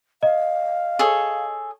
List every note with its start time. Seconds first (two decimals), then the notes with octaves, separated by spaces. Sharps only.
0.23 D#5 F5
0.99 G#4 A4 C#5